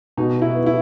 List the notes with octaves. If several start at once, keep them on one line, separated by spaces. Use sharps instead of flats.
B2 D#4
E4
B3
E4